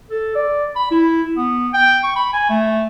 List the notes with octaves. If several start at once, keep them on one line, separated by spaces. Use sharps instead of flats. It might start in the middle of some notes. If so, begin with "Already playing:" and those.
A4
D5
B5
E4
B3
G5
C#6
B5
G#5
A3